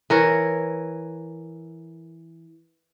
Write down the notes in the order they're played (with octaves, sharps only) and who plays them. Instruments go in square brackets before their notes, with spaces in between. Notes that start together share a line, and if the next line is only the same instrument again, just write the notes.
[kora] E3 A#4 C#5